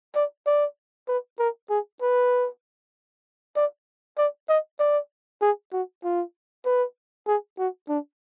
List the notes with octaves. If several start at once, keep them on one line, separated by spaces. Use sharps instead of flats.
D5
D5
B4
A#4
G#4
B4
D5
D5
D#5
D5
G#4
F#4
F4
B4
G#4
F#4
D4